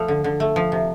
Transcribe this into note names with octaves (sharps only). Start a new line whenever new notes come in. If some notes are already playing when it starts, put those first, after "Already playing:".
Already playing: F3 A3 A4
D3
D3
A3
F3
C3